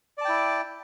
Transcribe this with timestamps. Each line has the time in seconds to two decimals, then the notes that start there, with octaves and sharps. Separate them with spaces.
0.18 D5
0.21 A5
0.25 G5
0.29 E4